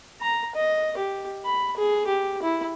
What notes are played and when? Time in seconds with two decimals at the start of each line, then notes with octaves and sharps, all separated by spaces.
0.21 A#5
0.55 D#5
0.97 G4
1.45 B5
1.77 G#4
2.07 G4
2.42 E4